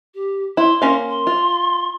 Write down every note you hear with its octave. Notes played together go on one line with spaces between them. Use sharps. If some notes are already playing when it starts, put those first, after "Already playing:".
G4
E4 C6
A#3 C#4 F5
C6
F4